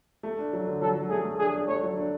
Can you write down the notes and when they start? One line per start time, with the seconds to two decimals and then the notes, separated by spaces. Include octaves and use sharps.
0.23 A3
0.38 D4
0.53 F#3
0.67 D3
0.81 F#3 A4
0.95 F#3
1.10 A3 G#4
1.24 A3
1.39 D4 G#4
1.54 D4
1.67 A3 C#5
1.83 F#3
1.97 D4